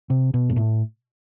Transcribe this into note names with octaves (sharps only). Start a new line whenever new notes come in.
C3
B2
G2
A2